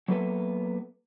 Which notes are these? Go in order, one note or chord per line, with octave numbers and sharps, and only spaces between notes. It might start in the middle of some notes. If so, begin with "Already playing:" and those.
F#3 A#3 B3 A4 B4 E5